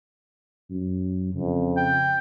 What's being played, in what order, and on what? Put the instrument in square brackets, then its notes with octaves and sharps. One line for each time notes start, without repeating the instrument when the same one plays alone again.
[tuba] F#2
[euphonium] F2 [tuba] C#3
[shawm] G5